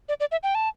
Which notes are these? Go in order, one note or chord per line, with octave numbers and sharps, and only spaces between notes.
D5
D5
E5
G5
A5